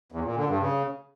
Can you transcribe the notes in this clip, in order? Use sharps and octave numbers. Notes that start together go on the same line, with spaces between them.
E2
A#2
D3
G2
C#3